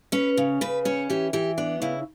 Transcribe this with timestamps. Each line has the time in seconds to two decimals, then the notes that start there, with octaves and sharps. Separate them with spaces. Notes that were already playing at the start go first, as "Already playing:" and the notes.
0.12 C#4 B4
0.37 C#3
0.61 C#3 B4
0.85 C#4 C#5
1.10 E3 G4
1.33 E3 G4
1.58 B3 D4
1.82 C#3 E4